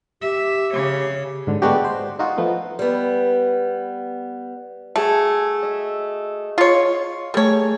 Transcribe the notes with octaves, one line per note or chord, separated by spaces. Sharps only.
G4 E5
C#3 C#5
G#2 D3
G#3 A3 B3 D4 F#4 G4
C5
D#4 F4 F#4
F3 A3 B3
G3 B3
A3 F#4 G#4 G#5
D#5 E5
F4 C#5
G3 A3 G#4 A#4 C#5